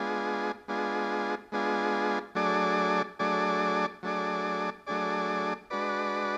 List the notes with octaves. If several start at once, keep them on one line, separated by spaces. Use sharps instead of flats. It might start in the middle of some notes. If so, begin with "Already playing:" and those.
Already playing: G#3 B3 D4 F4 G#4
G#3 B3 D4 F4 G#4
G#3 B3 D4 F4 G#4
F#3 A3 D4 G#4 D5
F#3 A3 D4 G#4 D5
F#3 A3 D4 G#4 D5
F#3 A3 D4 G#4 D5
G#3 D4 F#4 B4 D5